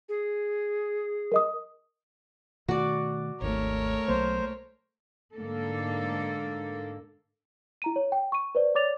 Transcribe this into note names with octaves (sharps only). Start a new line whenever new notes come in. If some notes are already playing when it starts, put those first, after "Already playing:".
G#4
A#4 D#5 D#6
B2 D#3 A3 F#4 D5
G#1 D#2 A3 A#4 C#5
B1 F#3 A#3 C5
G#2 D3 A#3 A4
E4 A#5 D#7
C#5
G5
C#6 D#7
B4 C5 D5
C#5 D5 D6 A6 F7